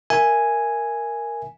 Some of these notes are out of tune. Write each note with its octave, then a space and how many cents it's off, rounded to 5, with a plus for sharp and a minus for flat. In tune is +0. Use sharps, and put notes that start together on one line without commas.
A#4 +0 E5 +0 G#5 +0